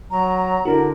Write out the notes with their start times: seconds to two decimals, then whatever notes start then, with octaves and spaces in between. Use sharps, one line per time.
0.10 F#3 A#5
0.65 D3 D4 E4 F#4 A#4